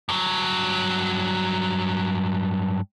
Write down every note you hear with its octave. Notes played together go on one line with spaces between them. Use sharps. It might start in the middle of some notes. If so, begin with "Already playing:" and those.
G2 F#3